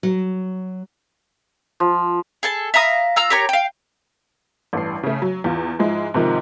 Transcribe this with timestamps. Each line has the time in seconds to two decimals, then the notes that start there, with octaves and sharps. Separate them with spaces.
0.03 F#3
1.80 F3
2.43 G#4 A4 A5
2.74 E5 F5 A#5 D#6
3.16 F4 A#5 E6 F6
3.30 G4 A#4 C#5 A#5
3.49 F5 G5
4.73 A1 G2 C7
5.03 C#3 A3
5.22 F#3
5.44 E2 F4
5.79 G#2 F3 G#3 E4
6.14 G#2 C3 D#3 F3